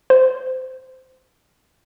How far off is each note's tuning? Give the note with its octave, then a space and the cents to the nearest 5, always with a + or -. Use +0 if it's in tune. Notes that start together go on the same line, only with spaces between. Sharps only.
C5 -15